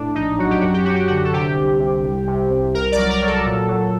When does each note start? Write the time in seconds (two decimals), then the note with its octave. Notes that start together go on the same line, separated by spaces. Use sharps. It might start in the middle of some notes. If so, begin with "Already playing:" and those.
Already playing: A2 D4
0.15 A#1 D#4
0.38 F#3 F#4
0.50 G4
0.61 F#2 F#4
0.74 G4
0.85 F#3 F#4
0.96 G4
1.08 D3 F#4
1.24 A4
1.34 C3 G4
1.56 C2
1.80 C3
2.03 C2
2.27 C3
2.50 C2
2.74 C2 A#4
2.92 D5
2.97 F#3
3.10 A#4
3.22 F#3 A4
3.45 A#2
3.68 F#3